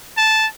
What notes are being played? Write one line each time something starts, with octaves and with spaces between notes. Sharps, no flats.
A5